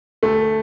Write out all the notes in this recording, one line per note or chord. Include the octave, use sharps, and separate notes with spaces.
D2 A3